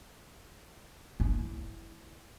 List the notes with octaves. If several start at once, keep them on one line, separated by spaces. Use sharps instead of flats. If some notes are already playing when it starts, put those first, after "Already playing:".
E4